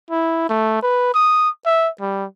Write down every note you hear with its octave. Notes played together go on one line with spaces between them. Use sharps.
E4
A3
B4
D#6
E5
G3